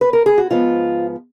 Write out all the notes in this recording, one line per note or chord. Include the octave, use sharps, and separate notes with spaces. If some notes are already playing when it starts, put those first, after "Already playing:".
B4
A#4
G#4
F#4
G#2 F3 B3 F4